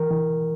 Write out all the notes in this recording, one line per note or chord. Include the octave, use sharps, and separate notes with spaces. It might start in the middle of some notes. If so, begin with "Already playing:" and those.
Already playing: E3 A#4
E3